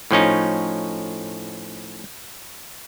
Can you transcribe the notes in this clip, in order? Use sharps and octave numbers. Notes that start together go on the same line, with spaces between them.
A2 F3 C#4 D#4